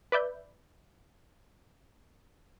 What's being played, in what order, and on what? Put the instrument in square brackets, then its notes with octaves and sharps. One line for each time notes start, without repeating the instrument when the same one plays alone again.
[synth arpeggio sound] B4 D5 E5 G6